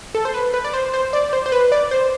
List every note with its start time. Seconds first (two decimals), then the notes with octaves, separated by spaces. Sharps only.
0.15 A4
0.25 C5
0.34 B4
0.54 B4
0.64 D5
0.74 C5
0.94 C5
1.13 D5
1.33 C5
1.46 C5
1.52 B4
1.72 D5
1.91 C5